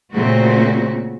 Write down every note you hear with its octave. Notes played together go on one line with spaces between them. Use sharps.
A#2 C#3 A3 C4 F#4